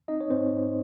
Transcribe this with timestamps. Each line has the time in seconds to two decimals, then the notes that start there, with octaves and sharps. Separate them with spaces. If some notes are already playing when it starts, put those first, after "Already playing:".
0.08 C4 D#4 D#5
0.21 C#5
0.30 G#2 C4 C5
0.53 G#2